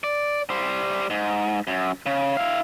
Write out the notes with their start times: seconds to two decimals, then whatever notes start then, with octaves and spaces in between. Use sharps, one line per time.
0.04 D5
0.50 G3 C5
1.10 G#2
1.67 F#2
2.06 C#3
2.37 E4 F5